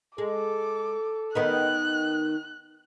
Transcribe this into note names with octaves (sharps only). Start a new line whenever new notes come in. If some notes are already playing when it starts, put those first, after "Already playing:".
G#3 A4 D6
D#3 B3 D#4 F#6